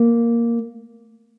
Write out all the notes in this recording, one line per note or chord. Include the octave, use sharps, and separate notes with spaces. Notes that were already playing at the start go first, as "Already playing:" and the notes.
Already playing: A#3